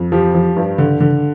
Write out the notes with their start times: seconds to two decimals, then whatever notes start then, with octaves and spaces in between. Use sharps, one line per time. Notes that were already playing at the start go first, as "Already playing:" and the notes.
Already playing: F2
0.12 F3 G4
0.34 F3
0.56 G2
0.78 D3
1.00 D3